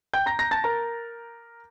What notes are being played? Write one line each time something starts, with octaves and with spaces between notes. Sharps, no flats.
G5 G6
A#5 A#6
A#5 A#6
A5 A6
A#4 A#5